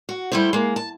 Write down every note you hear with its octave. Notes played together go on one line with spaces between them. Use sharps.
F#4
G3 A3 E4 G4 C5
G#3 A#3
A5